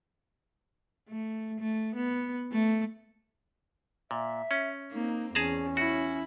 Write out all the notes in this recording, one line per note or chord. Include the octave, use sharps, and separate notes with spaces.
A3
A3
B3
A3
A#2 E5
C#4
A#3 C4 D#4
E2 C#4 G#4 A5 A#5
E4 F#4